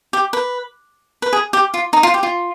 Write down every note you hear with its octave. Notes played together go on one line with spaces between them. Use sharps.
G4
B4
B4
G#4
G4
F4
D#4
F4
G4
F4